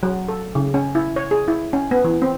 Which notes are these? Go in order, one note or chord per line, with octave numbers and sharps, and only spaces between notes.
F#3
A4
C#3
C#4
E4
C#5
G#4
E4
C#4
B3
E3
C4